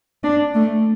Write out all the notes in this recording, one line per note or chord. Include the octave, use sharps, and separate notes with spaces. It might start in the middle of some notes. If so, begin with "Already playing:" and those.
D4
A3